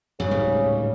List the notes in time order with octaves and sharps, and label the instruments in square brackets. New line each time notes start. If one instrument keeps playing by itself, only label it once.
[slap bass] F#2 F#3 [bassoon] C#3
[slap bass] D1 G#2 G3